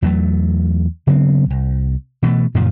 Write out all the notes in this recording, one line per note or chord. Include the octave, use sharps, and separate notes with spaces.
E2 F#3 G#3 A3
C#3 F#3 B3 C4
C2
B2 E3 F#3 A3
F#2 A#2 C#3 F3